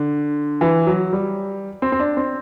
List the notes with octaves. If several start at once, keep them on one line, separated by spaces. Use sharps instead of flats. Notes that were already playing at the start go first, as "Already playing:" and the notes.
Already playing: D3
E3
F#3
G3
C4
C4
D4
C4